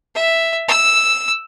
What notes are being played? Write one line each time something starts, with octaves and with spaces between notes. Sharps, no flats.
E5
E6